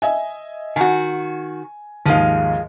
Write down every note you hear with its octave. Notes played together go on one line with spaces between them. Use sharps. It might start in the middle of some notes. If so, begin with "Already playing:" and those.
D#5 E5 G#5
D#3 F#4 G#5
D#2 G#2 F3 G#3 F5